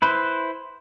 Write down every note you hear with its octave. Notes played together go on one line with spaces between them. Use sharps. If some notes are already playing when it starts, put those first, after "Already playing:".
E4 B4 C5